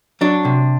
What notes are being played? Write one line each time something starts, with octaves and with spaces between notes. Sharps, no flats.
F#3 D4
C3